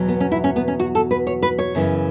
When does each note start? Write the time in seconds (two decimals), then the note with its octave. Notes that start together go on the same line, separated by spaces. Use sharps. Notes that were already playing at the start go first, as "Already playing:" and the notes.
Already playing: E2 B2 F#3
0.08 B3
0.20 C#4
0.32 E4
0.44 C#4
0.56 B3
0.68 C#4
0.80 F#4
0.95 A4
1.11 B4
1.27 C#5
1.43 B4
1.58 C#5
1.75 F#2 C#3 E3